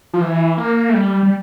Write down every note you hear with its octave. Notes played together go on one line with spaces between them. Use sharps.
F3
E3
A#3
A3
G3
G3